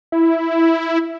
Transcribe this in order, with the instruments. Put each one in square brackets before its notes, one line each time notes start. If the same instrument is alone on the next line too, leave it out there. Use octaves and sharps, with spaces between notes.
[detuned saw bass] E4